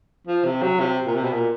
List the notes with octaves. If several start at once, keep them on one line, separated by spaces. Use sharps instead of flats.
F3
C3
F#3
C3
A#2
C3
B2
A#2